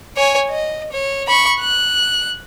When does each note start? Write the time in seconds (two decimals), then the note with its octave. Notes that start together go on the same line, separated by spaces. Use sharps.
0.17 C#5 G#5
0.50 D#5
0.92 C#5
1.27 B5 C#6
1.60 F#6